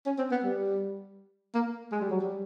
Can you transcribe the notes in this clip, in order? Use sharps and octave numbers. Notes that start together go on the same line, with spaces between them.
C#4
C4
B3
G3
A#3
G#3
G3
F#3
G3